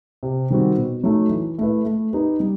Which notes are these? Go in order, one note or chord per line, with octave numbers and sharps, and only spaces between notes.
C3
D#3 G3 C4 F#4
B2
F#3 A3 D#4
E3
A3 E4 B4
A3
D#4 G4 B4
G3